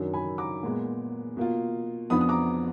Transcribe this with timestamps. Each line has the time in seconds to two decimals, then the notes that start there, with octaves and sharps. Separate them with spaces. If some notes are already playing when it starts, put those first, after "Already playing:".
Already playing: F#2 D#3 F#3 D4
0.13 G#5 B5
0.38 A#5 D6
0.63 A#2 G#3 B3
1.37 B2 A#3 F4
2.10 F2 F3 B3 D4 B5 D#6
2.21 D#6
2.29 A#5 D6